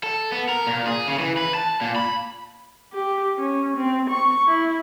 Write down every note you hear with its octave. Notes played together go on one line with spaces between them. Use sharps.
A4
B3
A#4
A#2
G#4
C#3
E3
B4
A5
A#2
B5
G4
C#4
C4
C#6
E4